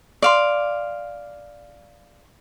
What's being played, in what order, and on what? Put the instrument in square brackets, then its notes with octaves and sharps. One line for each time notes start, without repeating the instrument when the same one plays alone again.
[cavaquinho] D5 F5 C6